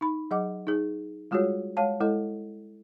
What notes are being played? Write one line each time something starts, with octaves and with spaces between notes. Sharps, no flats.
D#4 B5
F#3 G#4 D#5 F#5 D6
D#4 G#4
G3 G#3 F4 F#4 G#4 C#5
G#3 C#5 F5 A5
G#3 E4 A4 D#5